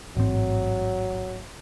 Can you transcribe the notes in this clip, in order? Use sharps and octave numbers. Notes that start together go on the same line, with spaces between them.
A1 G#2 F#3 C4